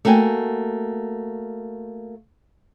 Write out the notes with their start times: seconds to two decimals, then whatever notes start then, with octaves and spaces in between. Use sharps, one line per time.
0.05 A3 A#3 F#4 G5 G#5